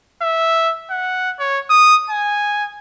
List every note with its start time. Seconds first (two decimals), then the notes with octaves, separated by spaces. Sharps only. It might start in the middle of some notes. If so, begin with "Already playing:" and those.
0.22 E5
0.91 F#5
1.39 C#5
1.70 D#6
2.10 G#5